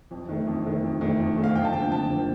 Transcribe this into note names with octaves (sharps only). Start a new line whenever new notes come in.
F2
D#3 A3
F2
D#3 A3
F2
D#3 A3
F2
D#3 A3
F5
F2 G5
A5
D3 F3 A#3 G5
F2 A5
D3 F3 A#3